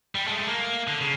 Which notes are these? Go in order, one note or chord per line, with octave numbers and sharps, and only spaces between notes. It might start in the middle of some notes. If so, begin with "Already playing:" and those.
G3
G#3 A3
A#3
D3
C#3